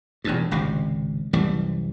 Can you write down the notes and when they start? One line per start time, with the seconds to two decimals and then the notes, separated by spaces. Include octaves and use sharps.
0.24 E1 E2 G2
0.51 G#1 C#2 C3
1.33 C2 F#2 E3 G3